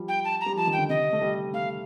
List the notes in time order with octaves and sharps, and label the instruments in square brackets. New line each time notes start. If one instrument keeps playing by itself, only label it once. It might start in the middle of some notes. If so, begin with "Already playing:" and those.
Already playing: [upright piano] F3 G3
[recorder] G5
A5
A#5
[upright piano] G3
[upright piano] F3 [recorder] A5
[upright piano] D#3
[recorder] G5
[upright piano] D3
[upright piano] C3 [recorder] D#5
[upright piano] A3
G3
[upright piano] A3 [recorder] F5